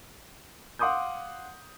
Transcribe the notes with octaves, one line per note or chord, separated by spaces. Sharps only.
F5 F#5 C6 D6 D#6 G6